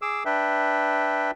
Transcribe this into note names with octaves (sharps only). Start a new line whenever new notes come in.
G#4 D6 E6
D4 B4 E5 G5